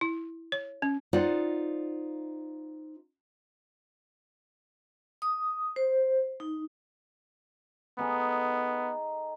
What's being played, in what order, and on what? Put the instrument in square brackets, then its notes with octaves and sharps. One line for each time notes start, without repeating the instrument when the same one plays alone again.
[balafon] E4
C#5
C#4
[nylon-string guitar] D#4 F4 C5 D5 D#5 F#5
[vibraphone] D#6
C5
D#4
[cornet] B3 [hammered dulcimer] D#4 G#4 A4